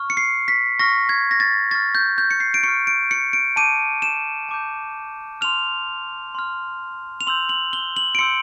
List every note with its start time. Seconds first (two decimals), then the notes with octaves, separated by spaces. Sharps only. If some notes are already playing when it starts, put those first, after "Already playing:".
Already playing: C#6 F6
0.10 C#7
0.17 C7
0.48 B6
0.79 C#6 F6 A#6
1.09 G#6
1.31 A#6
1.40 A6
1.71 C#6 F6 A6
1.95 G6
2.18 G6
2.31 C#7
2.40 C7
2.54 D7
2.63 C#6 F6 C#7
2.87 D7
3.11 C#7
3.33 D7
3.56 A5 D6 G6 D#7
4.02 E7
4.49 A5 D6 G6
5.41 C6 F6 F7
6.35 C6 F6
7.21 F7
7.27 C6 E6 G6 F#7
7.49 F#7
7.73 G7
7.96 F#7
8.15 D7
8.19 C6 E6 G6 C#7